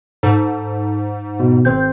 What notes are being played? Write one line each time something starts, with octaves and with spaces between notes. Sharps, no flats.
G#2 A4
B2
G#1 C4 C5 G6